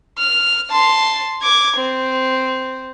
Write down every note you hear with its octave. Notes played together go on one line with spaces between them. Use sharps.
F6
A5 C6
D6 G#6
C4